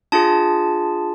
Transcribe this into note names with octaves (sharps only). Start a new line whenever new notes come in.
D4 F4 G#4 A5